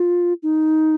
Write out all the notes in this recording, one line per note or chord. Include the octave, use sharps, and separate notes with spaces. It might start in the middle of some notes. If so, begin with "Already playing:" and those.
Already playing: F4
D#4